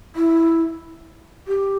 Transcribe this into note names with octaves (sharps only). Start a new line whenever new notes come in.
E4
G4